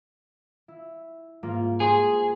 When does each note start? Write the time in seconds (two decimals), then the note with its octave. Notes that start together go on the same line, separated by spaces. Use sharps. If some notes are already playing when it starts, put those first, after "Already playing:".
0.68 E4
1.43 G#2 A#3 F4
1.80 G4 G#4 C5